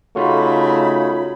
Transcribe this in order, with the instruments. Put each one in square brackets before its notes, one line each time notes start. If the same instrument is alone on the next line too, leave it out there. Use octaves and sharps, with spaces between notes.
[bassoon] C#3 [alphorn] A3 [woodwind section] D#4 B5 [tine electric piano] F4 F#4